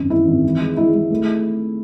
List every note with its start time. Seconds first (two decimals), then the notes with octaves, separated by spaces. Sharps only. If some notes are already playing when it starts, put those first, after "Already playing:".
Already playing: G#1 F#2
0.10 F#2 E4
0.27 G#1
0.43 E3
0.60 G#3
0.77 G#3 E4
0.94 G#3
1.10 A3